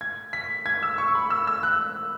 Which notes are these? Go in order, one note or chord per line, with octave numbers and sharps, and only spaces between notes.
G#6
B6
G#6
E6
C#6
B5
E6
E6
F#6